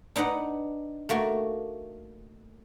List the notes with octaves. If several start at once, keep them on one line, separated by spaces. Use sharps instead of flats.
D4 D#4 B4 D#5 F#5
A3 A#3 F#4